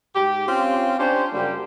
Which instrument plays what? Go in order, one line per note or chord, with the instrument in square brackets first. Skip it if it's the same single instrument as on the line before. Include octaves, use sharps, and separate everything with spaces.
[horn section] G#2 G4
C4 C#4 F4
C#4 D4 G4 C5
F#2 C#3 G3 A#3 G4